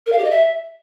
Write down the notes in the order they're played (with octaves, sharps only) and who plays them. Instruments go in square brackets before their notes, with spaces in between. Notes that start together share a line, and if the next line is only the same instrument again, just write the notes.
[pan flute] A#4
F5
G4
D#5
E5